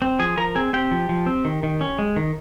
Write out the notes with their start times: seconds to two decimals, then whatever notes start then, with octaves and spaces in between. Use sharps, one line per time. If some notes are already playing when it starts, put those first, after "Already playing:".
0.02 C4
0.19 F3 G#4 G#5
0.37 F3 A#4 A#5
0.55 C4 G#4 G#5
0.73 C4 G4 G5
0.91 F3
1.09 F3
1.26 C4
1.45 D#3
1.63 D#3
1.81 C#4
1.99 G#3
2.16 D#3